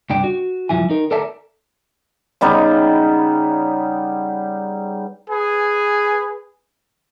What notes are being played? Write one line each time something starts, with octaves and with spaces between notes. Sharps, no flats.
C2 G2 D4 G5
F#4
C2 F#2 B2 F3 E4 G#5
D#4 A#4
A4 A#4 D5 E5 A5 A#5
C#3 G3 B3 D#4
G#4 B4 G#5